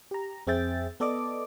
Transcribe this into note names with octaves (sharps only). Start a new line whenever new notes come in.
G4 A#5
F2 C4 G#4 E5 G5 A6
B3 A4 D5 D#5 D6